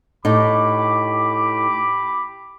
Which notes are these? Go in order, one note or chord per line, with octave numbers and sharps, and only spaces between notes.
A2 D#4 G4 B5 D6